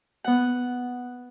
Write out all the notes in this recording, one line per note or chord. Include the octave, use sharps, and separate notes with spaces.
B3 F#5